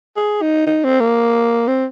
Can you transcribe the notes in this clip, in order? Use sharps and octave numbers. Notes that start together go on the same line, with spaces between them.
G#4
D#4
D#4
C4
A#3
C4